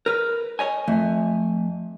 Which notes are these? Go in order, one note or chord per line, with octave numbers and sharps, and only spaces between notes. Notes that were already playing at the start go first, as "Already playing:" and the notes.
A#4 B4
C#5 D#5 G#5
F2 A3 G#5